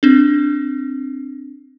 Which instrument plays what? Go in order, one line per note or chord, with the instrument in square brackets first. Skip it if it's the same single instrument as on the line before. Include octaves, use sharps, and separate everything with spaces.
[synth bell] C4 D4